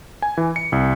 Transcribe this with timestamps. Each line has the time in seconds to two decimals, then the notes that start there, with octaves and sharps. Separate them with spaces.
0.22 G#5
0.37 E3
0.56 C#7
0.72 C2